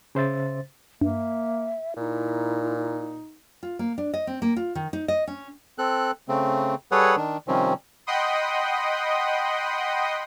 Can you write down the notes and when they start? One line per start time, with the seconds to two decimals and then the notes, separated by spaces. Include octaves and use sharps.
0.15 C#3 C5 E5 A6
1.01 G2 A#3 E5
1.97 A#2 D#4 E4
3.63 F4
3.79 A#3
3.98 D4
4.14 D#5
4.27 C4
4.42 A#3
4.57 F4
4.75 D#3
4.93 D#4
5.08 D#5
5.27 C#4
5.78 C4 A4 F#6
6.28 C#3 A3 C4
6.92 G3 G#4 A4 B4 C#5 F#5
7.17 D#3 D4
7.48 C3 D#3 F3 G3 C4 C#4
8.07 D#5 F#5 G5 B5 C6 D#6